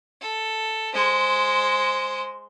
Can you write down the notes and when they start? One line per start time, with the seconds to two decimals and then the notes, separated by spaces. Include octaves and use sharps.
0.21 A4
0.94 G#3 C5